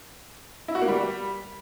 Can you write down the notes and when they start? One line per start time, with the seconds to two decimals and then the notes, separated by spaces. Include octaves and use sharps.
0.68 E4
0.75 F#4
0.81 A#3
0.88 G3